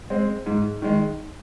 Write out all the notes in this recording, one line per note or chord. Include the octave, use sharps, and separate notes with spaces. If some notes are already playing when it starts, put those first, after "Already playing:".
G#3 C4
G#2
D#3 G#3